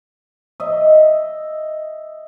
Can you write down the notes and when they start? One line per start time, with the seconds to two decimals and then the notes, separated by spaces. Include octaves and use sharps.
0.60 D#5 E5